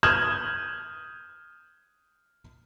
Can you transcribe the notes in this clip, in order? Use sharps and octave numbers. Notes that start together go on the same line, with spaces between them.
D#6 F6 G6 G#6 E7 F#7